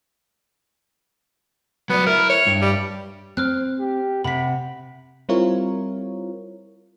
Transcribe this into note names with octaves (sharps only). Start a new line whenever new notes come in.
F#3 B3 D5
E4 A#4
C#5
G2
G3
C4 C5 F6 F#6
G4
C3 F#5 B5 B6
G3 C4 E4 F4 A#4 C#5